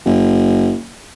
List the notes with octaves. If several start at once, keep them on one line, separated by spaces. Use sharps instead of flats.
F#1